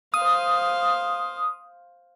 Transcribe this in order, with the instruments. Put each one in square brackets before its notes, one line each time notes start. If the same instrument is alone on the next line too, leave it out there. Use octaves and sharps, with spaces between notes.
[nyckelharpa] C5 F5 [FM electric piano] D#6